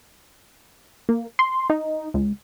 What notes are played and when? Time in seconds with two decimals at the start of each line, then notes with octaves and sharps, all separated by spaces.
1.09 A#3
1.39 C6
1.70 D#4
2.14 C#2